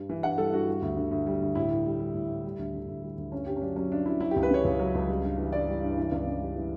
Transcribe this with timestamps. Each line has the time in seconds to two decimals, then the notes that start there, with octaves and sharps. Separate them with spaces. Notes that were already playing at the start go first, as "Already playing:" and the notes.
Already playing: G2 G3
0.09 E3
0.23 G2 F#5
0.38 G3 A4
0.52 G2 F#4
0.68 G3
0.82 D2
0.97 D3
1.11 D2
1.27 G3
1.42 D2
1.55 A2 E4
1.71 A2
1.86 G3
2.00 G3
2.14 A2
2.30 A2
2.44 G3
2.59 D2
2.74 D3
2.88 D2
3.03 G3
3.18 D2
3.32 G2 C#4
3.47 G2 G4
3.56 C#4
3.61 F#3 D4
3.76 F#3 C#4
3.92 G2 D4
4.06 G2 E4
4.20 F#3 E4
4.31 C#2 G4
4.43 B4
4.50 C#3 C#5
4.65 C#2
4.79 F#3
4.95 C#2
5.08 G3
5.24 G2
5.38 E3
5.52 G2 D5
5.68 G3
5.83 G2
5.98 E3
6.12 C#2
6.27 C#3
6.41 G3
6.56 E3